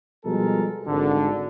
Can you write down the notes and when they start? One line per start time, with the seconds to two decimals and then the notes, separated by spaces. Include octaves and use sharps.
0.25 B2 F3 G3 G#3 A4 A#4
0.87 G#1 D3